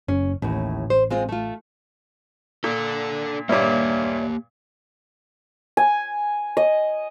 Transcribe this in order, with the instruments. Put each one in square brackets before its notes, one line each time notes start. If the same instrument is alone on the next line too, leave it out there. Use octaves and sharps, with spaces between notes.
[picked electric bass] F#1 [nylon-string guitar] C#4
[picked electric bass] A1 [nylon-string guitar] D#2 A2
[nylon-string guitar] C5
G#3 C4 F4
A3 F4
[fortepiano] A#2 [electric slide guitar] D4 A4
[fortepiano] G2 A#2 [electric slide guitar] A#3 G4 [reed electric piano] C#5 D5 E5
[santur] G#5
D#5